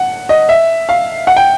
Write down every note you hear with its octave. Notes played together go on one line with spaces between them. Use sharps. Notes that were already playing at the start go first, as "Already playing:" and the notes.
Already playing: F#5
D#5
E5
F5
F#5
G5